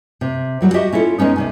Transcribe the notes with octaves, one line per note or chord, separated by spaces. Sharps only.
C3
D#2 F#3 G3 F#4
F#4 G4 D#5 E5
C#4 E4 F4 A4
G#3 B3 C#4 D#4
D2 C3 G#5